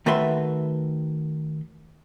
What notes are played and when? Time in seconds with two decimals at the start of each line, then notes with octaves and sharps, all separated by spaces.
0.06 D#3 A3 F#4 B4 E5 C6